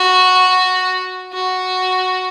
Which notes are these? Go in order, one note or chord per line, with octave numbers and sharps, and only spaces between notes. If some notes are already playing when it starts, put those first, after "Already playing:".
Already playing: F#4
F#4